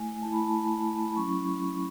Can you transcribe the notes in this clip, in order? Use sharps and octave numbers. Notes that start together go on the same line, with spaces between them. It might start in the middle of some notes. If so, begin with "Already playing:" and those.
Already playing: A3 E4 G#5
A3 E4 A5
B5
A5
B5
F#3 C#4 E4 C#6